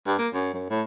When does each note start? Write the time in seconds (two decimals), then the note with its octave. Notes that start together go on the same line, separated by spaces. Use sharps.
0.07 G2
0.19 A#3
0.33 F#2
0.54 F#2
0.70 A2